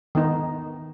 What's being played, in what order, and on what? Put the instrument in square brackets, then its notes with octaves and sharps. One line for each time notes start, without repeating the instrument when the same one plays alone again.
[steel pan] D#3 B3 D#4